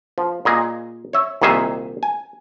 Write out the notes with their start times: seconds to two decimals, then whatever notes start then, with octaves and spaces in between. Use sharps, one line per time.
0.18 F3
0.45 A#2 G#4 D#5
1.13 C#5 E5
1.42 C2 A#2 D#3 G#4 E5
2.03 G#5